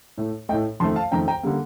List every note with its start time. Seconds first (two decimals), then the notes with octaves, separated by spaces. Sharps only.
0.18 A2 A3
0.49 A3 D#5 G5
0.53 A2
0.80 F2 D#3 A3 A5 C6
0.96 F5 A5
1.12 F2 D#3 A3 G5 A#5
1.28 G5 A#5
1.43 D3 G3 A#3